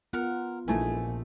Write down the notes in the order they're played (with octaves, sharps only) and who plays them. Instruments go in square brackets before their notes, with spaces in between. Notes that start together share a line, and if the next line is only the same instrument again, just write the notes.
[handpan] B3 F4 [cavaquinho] A#4 F#5
[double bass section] A#1 [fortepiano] E3 A3 D#4 [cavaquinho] G#5